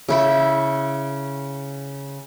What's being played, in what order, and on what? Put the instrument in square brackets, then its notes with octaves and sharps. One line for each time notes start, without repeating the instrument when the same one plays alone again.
[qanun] C#3 E4 G5